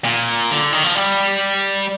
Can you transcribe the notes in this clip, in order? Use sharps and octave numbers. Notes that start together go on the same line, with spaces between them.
A#2
D3
D#3
F3
G3